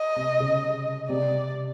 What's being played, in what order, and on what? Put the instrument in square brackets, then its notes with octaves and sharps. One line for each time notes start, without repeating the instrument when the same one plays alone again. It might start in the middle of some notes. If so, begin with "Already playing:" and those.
Already playing: [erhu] D#5
[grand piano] C3
C#3
[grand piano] C3 [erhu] D5